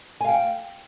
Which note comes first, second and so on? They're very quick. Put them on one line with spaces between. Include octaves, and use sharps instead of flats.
G#5 F5 G5